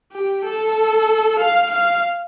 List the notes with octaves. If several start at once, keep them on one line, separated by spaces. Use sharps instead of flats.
G4
A4
F5
F5